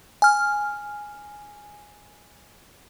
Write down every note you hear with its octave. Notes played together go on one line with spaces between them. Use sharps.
G#5 F6